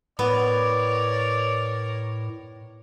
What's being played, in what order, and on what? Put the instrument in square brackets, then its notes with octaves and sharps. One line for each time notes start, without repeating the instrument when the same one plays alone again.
[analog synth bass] A2 [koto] B3 [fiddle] A#4 C#5 [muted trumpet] D5